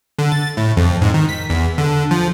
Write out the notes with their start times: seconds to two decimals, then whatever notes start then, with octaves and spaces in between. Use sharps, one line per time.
0.18 D3
0.32 A6
0.57 A2
0.77 F2
1.02 G#2
1.14 D#3
1.29 B6
1.50 E2
1.78 D3
2.11 F3